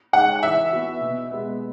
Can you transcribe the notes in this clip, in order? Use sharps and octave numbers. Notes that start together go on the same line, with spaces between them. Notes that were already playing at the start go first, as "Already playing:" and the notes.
G#3 D#4 G#4 C#5 F#5
E3 E5
B3 F#4
B2
G#3 B3